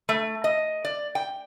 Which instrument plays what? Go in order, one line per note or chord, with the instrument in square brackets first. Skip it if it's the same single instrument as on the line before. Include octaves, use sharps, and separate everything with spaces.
[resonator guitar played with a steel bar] A3
D#5
D5
G5